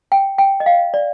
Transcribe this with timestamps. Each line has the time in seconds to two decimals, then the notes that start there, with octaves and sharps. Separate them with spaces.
0.12 G5
0.38 G5
0.60 D#5
0.66 F5
0.94 D5